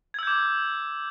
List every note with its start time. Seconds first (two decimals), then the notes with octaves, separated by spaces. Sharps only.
0.14 G#6
0.19 E6
0.23 G6
0.27 D6